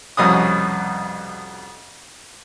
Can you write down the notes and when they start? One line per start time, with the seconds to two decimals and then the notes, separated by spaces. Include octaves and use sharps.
0.17 C2 F2 B2 C#4 D#6